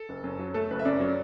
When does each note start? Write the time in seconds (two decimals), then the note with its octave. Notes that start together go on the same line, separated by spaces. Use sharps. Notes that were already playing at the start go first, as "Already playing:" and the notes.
Already playing: A4
0.09 F#1
0.24 F#2
0.39 F#3
0.54 A3 A4
0.70 F#1 B4
0.79 E5
0.85 F#2 D5
1.00 F#3